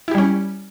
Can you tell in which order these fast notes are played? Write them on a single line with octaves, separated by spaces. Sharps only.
E4 G4 G3 C#4